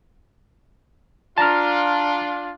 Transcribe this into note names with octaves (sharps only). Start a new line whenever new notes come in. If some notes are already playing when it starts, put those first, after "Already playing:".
D4 F4 A5 A#5 F6